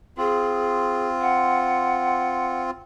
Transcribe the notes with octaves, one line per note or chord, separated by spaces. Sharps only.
C4 F4 G#4
F#5